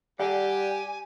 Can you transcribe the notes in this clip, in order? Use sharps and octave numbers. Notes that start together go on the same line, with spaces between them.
G3 G4 D5 F#5 G#5